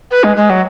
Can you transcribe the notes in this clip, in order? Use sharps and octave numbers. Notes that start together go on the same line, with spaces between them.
B4
G#3
G#3
F#3